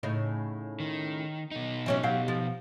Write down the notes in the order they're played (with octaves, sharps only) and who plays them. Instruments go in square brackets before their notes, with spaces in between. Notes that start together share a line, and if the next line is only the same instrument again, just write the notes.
[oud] A2 C#3 D#4
[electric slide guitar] D#3
B2 D#4
[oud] E3 F#3 C#4
F#3 G4 F5
F3